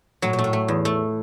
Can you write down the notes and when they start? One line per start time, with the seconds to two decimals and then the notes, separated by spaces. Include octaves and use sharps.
0.22 A2 F#3
0.33 A#2
0.39 A3
0.44 A2
0.53 A3
0.68 E2
0.85 A3